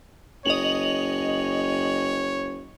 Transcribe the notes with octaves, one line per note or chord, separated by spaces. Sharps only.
F#1 C#5 D#5 F7 F#7